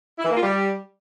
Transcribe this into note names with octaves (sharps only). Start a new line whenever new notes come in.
E4
E3
A#3
F4
G3